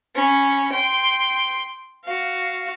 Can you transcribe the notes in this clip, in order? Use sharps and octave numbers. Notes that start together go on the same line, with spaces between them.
C#4 B5
G5 C6
F#4 F5